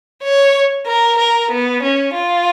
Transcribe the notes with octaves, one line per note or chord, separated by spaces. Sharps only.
C#5
A#4
A#4
B3
C#4
F4